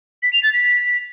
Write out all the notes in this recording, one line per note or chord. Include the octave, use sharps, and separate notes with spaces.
B6
F7
A6
B6